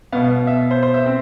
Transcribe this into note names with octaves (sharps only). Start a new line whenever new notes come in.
B2 B3 F5
F5
E5
C5
C5
E5
C4